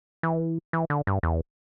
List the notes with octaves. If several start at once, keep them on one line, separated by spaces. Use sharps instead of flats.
E3
E3
D3
G2
E2